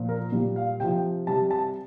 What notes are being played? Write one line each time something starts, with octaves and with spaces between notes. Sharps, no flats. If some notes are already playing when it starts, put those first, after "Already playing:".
Already playing: A#2 F3
A#4
A#2 G3
F5
C3 F3 G5
C3 G3 A5
A5